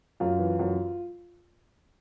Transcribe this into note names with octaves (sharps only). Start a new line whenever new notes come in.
F#2 F4
E3
F#2